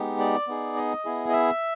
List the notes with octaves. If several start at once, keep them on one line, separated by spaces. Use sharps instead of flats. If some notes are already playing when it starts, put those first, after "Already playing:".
Already playing: G#3 B3 D#4 G4
D5
B3 D#4 G#4
D#5
B3 E4 G#4
D#5
E5